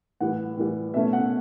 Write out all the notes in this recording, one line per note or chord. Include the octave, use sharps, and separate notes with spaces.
A2 E3 G3 F#5
A2 E3 G3
B2 A3 C#4 E5
F#5